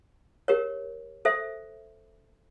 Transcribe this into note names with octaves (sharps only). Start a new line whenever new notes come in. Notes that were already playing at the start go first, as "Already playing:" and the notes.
G4 A#4 C#5
A4 C5 E5